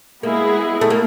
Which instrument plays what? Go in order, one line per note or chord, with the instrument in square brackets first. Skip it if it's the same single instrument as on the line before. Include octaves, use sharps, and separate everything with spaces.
[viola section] G#3 B3 E4 G#4 [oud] A#3
[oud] A3
A#3